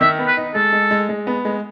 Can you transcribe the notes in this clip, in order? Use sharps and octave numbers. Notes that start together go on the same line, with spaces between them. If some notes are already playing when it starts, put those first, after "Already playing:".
D#3 E5
B3
B4
D#4
G#3 A4
G#3
G#3
G#3
B3
G#3